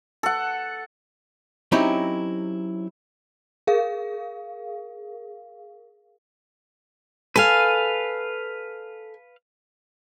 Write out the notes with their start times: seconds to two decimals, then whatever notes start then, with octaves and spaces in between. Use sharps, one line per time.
0.23 A4 F#5
1.72 F#3 C4 C#4 D#4 E4 G4
3.67 G#4 A#4 F5
7.36 A4 B4 F5 G#5